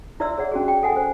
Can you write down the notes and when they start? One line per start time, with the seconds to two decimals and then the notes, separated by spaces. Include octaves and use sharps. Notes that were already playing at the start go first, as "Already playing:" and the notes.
0.20 E4 A#4 D5 E5 C6 E6
0.38 G#4 C#5 D5 F#5
0.52 C#4 F#4 G#4
0.68 G5
0.83 A4 F#5 G#5
0.96 C5